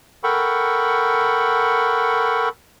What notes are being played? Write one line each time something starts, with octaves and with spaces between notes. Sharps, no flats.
A4 A#4 F#5 G5 B5 C#6